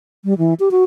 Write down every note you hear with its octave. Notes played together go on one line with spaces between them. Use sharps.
G3
E3
G4
F#4